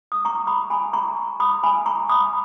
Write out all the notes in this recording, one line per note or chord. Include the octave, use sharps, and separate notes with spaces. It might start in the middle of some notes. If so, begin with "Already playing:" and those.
D#6
A#5 C#6
B5 D#6
G#5 B5
A#5 C#6
B5 D#6
G#5 B5
A#5 C#6
B5 D#6